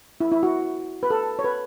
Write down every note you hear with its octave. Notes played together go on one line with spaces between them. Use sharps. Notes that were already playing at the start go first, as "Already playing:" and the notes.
E4
E4
F#4
B4
A4
C#5
B4